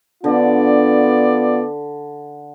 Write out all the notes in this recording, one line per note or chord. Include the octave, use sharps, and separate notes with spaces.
D3 B3 F4 D5